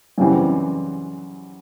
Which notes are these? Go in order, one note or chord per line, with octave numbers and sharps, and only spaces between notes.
F#2 C#3 E3 G3 C4